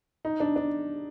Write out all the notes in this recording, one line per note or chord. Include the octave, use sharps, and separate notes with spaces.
D#4
D4
D4